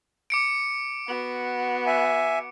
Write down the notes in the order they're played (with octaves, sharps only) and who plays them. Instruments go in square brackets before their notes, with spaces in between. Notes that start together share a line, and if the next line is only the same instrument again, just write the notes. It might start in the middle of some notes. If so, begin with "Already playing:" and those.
[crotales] D6 C#7 D7
[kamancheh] B3 F#4
[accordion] E5 G#5